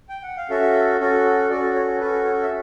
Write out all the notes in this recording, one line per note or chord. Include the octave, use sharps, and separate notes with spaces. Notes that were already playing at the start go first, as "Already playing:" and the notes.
G5
F#5
F5
C#4 F#4 A4 E5
C#4 F#4 A4
C#4 F#4 A4 D5
C#5
C#4 F#4 A4 B4
C#5
E5